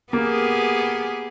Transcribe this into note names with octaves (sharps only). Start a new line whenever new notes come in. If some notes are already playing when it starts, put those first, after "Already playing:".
A#3 B3 G4 G#4